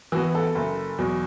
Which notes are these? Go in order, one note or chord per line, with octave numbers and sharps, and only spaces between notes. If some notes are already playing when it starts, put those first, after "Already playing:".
E3 B3 F#4
A4
F#1
E2 B2 F#3